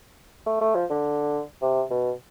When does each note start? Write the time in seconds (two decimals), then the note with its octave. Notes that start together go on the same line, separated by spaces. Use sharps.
0.46 A3
0.61 A3
0.75 F3
0.90 D3
1.62 C3
1.91 B2